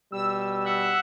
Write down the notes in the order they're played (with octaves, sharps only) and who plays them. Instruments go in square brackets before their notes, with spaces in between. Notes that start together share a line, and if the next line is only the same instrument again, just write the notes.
[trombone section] B2 G3 [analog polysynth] E6
[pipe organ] E5 F#5